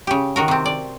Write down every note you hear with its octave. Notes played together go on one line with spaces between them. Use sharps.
C#3 G4
D#3 F#4 A#4
C3 C4
D5